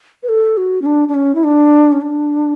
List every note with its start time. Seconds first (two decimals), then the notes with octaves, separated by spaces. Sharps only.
0.23 B4
0.29 A4
0.57 F#4
0.82 C#4
0.86 D4
1.08 D4
1.14 C#4
1.35 E4
1.44 D4
1.92 C#4
2.01 D4